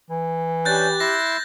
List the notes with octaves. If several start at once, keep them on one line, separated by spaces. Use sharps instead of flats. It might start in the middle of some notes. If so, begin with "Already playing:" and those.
E3
C#4 D4 G4 F#6 G6 A6
E4 C6 E6 A#6